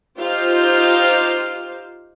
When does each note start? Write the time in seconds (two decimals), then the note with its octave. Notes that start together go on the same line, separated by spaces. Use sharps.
0.20 D#4 F4 G4 C5 F5